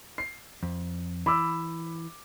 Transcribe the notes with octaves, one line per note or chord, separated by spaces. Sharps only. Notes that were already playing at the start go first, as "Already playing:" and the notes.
C7
F2
E3 B5 D6 E6